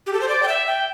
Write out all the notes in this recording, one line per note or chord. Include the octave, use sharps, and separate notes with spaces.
G4
A4
C5
D5
G5
E5
G5